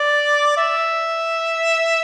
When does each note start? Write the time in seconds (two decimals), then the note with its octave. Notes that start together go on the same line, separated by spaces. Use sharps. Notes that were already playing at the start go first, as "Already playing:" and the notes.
Already playing: D5
0.57 E5